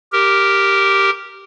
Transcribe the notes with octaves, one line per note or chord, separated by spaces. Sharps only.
G4 A#4